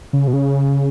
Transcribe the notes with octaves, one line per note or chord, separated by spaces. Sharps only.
C#3
B2
C#3